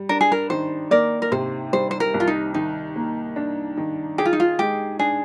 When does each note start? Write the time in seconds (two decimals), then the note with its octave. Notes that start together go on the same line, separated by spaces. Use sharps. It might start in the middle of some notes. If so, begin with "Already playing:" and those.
Already playing: G3
0.09 D4 A#4
0.21 G#4
0.32 A#4
0.50 D#3 C5
0.91 A#3 A#4 D5
1.22 A#4
1.32 C3 C5
1.73 G3 C5
1.91 C5
2.00 A#4
2.14 C2
2.20 F4
2.27 D#4
2.54 D#3 D#4
2.96 A#3
3.36 D4
3.77 D#3
4.18 G4 G#4
4.26 F4
4.33 D#4
4.40 F4
4.59 G#3 G4
4.99 D4 G#4